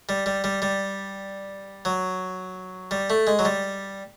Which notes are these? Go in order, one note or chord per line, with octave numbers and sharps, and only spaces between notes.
G3
G3
G3
G3
F#3
G3
A3
G#3
F#3
G3